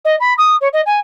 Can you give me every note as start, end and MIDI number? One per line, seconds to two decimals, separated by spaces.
0.05 0.16 75
0.20 0.33 83
0.38 0.56 87
0.61 0.68 73
0.73 0.81 75
0.86 0.99 80